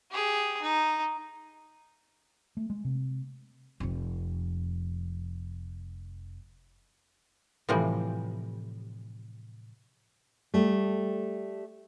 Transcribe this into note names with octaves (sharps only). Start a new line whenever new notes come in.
G4 G#4
D#4
A3
G#3
C3
F1 F2
A2 C3 E3 F3 G3
G3 A3